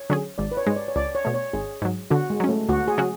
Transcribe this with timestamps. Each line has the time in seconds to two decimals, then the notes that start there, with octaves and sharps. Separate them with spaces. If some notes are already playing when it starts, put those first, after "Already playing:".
Already playing: C#5
0.10 D3 F#3 C#4 G#4
0.38 G#1 D5
0.52 B4
0.57 C#5
0.67 G#2 G#3
0.77 D5
0.88 C#5
0.96 C#2 D5
1.15 C#5
1.25 B2 A3
1.34 C#5
1.53 G#1 G#4
1.82 G#2 F#3
2.11 D3 F#4
2.30 G#3
2.40 F#3 C#4
2.49 A3
2.69 D2 F#4
2.88 G#4
2.98 C#3 F#3 C#4 F#4